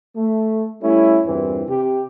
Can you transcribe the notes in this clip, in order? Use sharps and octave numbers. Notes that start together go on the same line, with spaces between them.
A3
G3 A3 C#4 E4
E2 G2 A#2 E3 C4
C3 G4